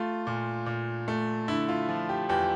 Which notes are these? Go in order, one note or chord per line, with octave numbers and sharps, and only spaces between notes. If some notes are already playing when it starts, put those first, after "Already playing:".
Already playing: A3 F4
A#2
A#2
A3
D3 E4
F4
F3
G4
E2 G4